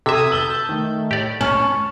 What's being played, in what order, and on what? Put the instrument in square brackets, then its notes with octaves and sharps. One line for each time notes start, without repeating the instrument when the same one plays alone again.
[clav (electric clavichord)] C3 E5 [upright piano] A4 [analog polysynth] D#6 G#6 B6
[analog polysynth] A5 G6 [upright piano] E6 F#7 G7
[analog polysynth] D#3 A3
[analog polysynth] A2 [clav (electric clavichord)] G4 D5
[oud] C#4 [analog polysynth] A5 [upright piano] F#7